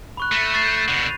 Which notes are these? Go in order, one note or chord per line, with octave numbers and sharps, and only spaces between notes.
B5 C#6 F#6
A3 A#6 D#7
C#6 A6 C7
G6
B2 D3